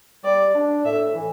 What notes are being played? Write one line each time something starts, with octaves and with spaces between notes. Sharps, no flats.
G3 D5
D4
A2 E5
E3